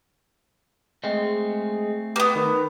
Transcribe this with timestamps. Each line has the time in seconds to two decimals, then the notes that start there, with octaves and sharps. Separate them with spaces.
1.04 G#3 A3 C4
2.16 A#3 B3 G4 B4
2.35 D#3 B4